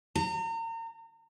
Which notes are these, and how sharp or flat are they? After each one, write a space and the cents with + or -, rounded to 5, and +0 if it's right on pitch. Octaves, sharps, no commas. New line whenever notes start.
A#5 -35